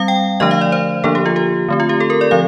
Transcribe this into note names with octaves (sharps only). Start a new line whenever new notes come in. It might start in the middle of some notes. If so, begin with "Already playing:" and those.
Already playing: G3 C4 F5
G5
D3 F3 A3 D4 D#5
F5
D5
C5
D3 F3 A#3 D4 A4
G4
F4
G4
D3 A3 C4
F4
G4
A4
A#4
D5
D3 F3 C4 F5